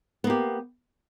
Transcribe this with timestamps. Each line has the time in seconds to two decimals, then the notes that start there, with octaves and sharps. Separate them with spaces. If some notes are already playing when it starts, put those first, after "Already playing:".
0.24 B3
0.27 A#3
0.30 G4